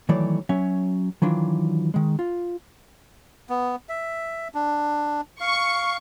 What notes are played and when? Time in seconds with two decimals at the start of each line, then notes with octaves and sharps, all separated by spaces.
0.09 D#3 E3 F#3 A3 C#5 D5
0.49 F#3 C#4 C#5 E5
1.22 D#3 E3 F#3 D4 F4
1.94 D#3 G#3
2.19 F4
3.50 B3
3.89 E5
4.54 D4
5.41 F5 C#6